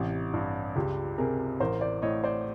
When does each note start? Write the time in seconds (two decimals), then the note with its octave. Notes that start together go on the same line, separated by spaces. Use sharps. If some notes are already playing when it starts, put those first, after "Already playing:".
Already playing: A1 C3
0.34 G2
0.75 C#2 F4 G4
1.18 C3 G#4 A#4
1.60 A1 A#4 C5
1.81 C5 D5
2.02 A2 C#5 D#5
2.24 C5 D5